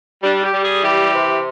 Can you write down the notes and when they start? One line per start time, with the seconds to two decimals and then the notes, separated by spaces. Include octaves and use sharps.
0.23 G3 D4
0.43 G4
0.53 G3
0.63 G#4
0.84 E3 G4
1.14 C3